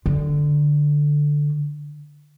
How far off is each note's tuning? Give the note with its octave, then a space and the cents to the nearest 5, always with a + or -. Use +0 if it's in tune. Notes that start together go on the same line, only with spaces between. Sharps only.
D3 +5